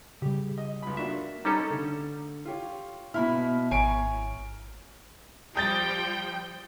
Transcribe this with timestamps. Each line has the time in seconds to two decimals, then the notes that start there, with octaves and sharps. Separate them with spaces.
0.22 C#3 G3 G4
0.58 D#5
0.82 C#2 B5
0.97 A#3 D4 F#4 E5
1.45 G3 C#4 D#4 A4
1.70 D3 A3
2.45 F4 G4 C#5
3.14 B2 E4 B5 F6
3.71 G#1 C#5 G#5 A#5 C#6 D7
5.56 F3 G3 G5 D#6 G6 A6